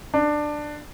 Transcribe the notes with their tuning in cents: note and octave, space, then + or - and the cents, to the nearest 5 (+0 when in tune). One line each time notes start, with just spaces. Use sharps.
D4 +15